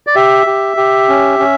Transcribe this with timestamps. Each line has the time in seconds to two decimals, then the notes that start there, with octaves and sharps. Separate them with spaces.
0.07 D5
0.15 G4 E5
0.46 G4
0.77 G4
1.08 C#4
1.39 C#4